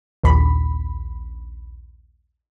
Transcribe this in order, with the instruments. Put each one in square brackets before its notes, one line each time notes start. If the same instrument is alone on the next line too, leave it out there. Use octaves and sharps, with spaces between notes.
[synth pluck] A#1 D#2 B5